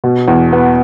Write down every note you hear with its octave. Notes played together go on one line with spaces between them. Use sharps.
B2
E2
B3